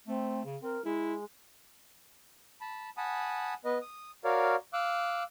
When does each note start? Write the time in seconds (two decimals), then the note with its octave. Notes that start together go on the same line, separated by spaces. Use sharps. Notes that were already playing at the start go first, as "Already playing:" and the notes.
0.07 A3 C4
0.45 C#3
0.63 C4 A#4
0.85 G#3 E4
2.61 A5 B5
2.97 F#5 G#5 A5 B5 D#6
3.65 B3 B4 D#5
3.82 D#6
4.24 F#4 A#4 C#5 D5 F5
4.73 F5 D6 E6 F#6